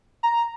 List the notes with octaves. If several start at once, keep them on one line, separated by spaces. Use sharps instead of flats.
A#5